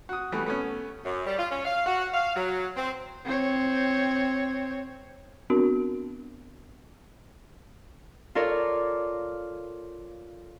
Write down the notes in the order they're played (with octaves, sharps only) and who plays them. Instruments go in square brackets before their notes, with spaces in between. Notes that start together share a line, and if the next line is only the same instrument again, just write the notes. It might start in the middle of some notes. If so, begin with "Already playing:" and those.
[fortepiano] F#4 D#6
E3 G3 A3 B3 F#4
A3 B3 C#4
[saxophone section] F#2
G3
F4
C#4
F5
F#4
F5
F#3
C4
[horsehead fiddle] C4 C#5
[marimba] B3 C4 D4 F#4 A#4
[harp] F4 A4 A#4 C#5 D5